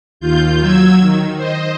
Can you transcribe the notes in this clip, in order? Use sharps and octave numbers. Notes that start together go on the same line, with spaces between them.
D#2 F4 G6
F#3 E6 G#6
D#3
C5 D#5